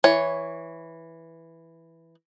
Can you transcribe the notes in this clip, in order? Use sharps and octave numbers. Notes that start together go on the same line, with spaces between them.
E3 C#5